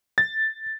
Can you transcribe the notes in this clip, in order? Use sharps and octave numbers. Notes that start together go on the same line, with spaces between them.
A6